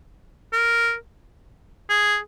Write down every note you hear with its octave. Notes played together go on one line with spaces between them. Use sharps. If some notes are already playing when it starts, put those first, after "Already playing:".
A#4
G#4